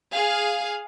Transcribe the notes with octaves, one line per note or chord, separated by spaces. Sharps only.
G#4 F5